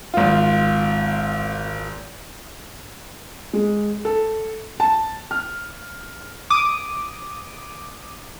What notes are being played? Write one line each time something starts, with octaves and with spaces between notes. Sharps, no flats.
G#1 F4
G#3
A4
A5
F6
D6 D#6